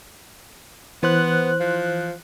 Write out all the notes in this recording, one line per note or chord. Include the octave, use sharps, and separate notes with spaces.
E3 B3 C5 F#6
F3